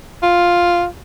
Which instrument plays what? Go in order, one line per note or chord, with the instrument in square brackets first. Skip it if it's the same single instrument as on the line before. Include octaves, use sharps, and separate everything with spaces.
[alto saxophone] F4